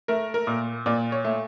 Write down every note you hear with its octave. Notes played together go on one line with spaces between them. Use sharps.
A3 A#4
A#4
A#2
A#2 D5
C#5
A3